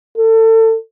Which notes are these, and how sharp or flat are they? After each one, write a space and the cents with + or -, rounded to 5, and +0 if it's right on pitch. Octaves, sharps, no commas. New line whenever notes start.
A4 +30